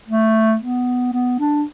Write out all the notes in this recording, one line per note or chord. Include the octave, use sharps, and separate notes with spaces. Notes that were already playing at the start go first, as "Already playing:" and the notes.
A3
B3
B3
D4